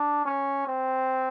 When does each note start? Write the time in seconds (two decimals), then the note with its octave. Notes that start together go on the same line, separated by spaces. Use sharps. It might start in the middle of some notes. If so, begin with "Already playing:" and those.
Already playing: D4
0.25 C#4
0.67 C4